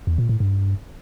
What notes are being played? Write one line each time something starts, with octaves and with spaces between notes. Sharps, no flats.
E2
A#2
A2
G2